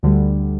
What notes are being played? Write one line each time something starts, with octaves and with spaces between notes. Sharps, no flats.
D2 D3 G3